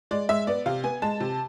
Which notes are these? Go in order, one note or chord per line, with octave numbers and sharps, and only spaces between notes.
G#3 D5
G#3 E5
B3 D5
C3 F5
B3 G#5
G#3 A5
C3